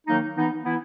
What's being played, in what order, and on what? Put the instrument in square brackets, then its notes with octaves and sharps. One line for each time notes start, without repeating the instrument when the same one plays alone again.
[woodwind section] D#3 F#3 A#3 D#4
E3 B3 D#4
E3 B3 E4